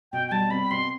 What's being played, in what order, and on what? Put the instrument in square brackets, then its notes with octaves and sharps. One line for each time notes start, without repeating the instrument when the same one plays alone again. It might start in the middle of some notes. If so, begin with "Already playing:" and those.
[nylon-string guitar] B2 [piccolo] G5
[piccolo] G5
[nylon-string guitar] G3 [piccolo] A5
[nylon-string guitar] C4 [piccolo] B5
[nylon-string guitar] B2 [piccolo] C6